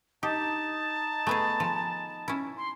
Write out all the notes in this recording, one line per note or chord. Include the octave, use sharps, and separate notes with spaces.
D#4 G4 A5
A3 B3 G#4 G#5 A#5 B5
F3
C#4 E4
C6